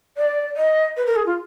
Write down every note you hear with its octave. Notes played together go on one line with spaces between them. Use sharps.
D5
D#5
B4
A#4
G#4
F4